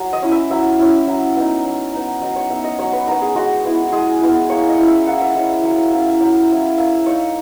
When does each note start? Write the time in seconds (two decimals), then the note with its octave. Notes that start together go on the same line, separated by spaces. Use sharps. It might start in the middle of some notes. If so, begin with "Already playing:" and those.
Already playing: F#3
0.13 D#5
0.22 C#4 E4
0.31 E5
0.50 F#3 E5
0.79 C#4 E4
1.07 F#3
1.36 B3 D#4
1.65 F#3
1.93 B3 D#4
2.22 F#3 D#5
2.36 C#5
2.50 B3 D#4 E5
2.64 D#5
2.79 F#3 C#5
2.93 B4
3.07 B3 D#4 A#4
3.21 G#4
3.35 G#3 F#4
3.64 B3 E4
3.92 G#3 G#4
4.21 B3 E4
4.49 A#3 C#5
4.69 D#5
4.78 C#4 E4
4.88 E5
5.06 A#3 F#5
5.21 E5
5.35 C#4 E4 D#5
5.50 E5
5.63 F#3 F#5
5.78 E5
5.92 A#3 C#4 E4 E5
6.06 E5
6.21 F#3 E5
6.49 A#3 C#4 E4
6.78 A#3 E5
7.06 D#4 C#5